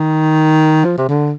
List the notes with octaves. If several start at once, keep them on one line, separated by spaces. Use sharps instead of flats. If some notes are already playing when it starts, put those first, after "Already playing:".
Already playing: D#3
F3
C3
D3